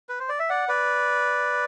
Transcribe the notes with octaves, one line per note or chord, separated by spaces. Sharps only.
B4
C5
D5
E5
D5 F#5
B4 D5